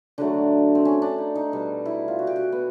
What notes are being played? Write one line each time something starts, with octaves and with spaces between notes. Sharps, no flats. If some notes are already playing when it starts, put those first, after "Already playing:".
D3 F#3 A3 D4
C4
C#4
D4
D#4
D#4
B2 G3
E4
F4
F#4
G4
F#4
B3